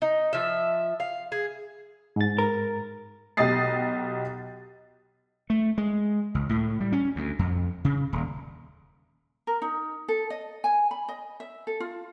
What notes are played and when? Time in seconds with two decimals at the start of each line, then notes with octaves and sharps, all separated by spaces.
0.02 D#4
0.33 F3 E5
1.00 F5
1.32 G#4
2.16 G#2 A6
2.38 A#4
3.37 B1 G4 D#5 D#6 A6 C7
5.50 A3
5.78 G#3
6.34 C#2
6.49 A2
6.80 G3
6.92 C#4
7.16 D2
7.39 F2
7.85 C#3
8.13 D#1
9.47 A#4
9.62 D#4
10.08 A4
10.30 D#5
10.64 G#5
10.91 B5
11.09 D#5
11.40 E5
11.67 A4
11.80 F4